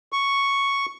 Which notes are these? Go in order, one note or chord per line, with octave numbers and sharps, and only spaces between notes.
C#6